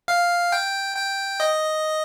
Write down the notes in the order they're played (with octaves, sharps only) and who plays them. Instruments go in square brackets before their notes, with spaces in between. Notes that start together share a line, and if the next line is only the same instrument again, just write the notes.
[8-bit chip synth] F5
G5
G5
D#5